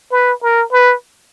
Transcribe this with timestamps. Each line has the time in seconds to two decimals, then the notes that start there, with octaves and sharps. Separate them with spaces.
0.12 B4
0.43 A#4
0.72 B4